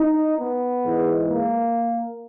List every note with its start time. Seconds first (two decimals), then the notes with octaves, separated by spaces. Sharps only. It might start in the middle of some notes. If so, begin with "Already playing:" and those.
Already playing: D#4
0.39 B3
0.84 G#2 E3 G#3
1.29 A#3